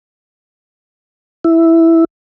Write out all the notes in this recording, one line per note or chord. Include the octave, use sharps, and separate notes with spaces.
E4